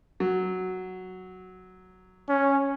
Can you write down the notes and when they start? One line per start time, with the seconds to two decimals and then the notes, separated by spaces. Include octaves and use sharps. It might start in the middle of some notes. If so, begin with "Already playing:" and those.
0.20 F#3
2.29 C#4